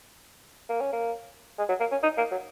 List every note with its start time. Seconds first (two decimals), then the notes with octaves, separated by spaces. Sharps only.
0.69 A#3
0.81 C#4
0.93 A#3
1.59 G#3
1.69 F#3
1.80 A#3
1.92 C#4
2.03 D#4
2.18 A#3
2.31 F#3